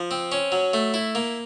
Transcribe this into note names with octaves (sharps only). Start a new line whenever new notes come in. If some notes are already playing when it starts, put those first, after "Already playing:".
Already playing: F3
C4
C#4
F#3
A3
E4
A#3